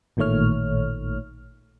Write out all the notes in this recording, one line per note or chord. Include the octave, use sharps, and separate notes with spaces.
A1 A#2 D#3 A3 C#5 F6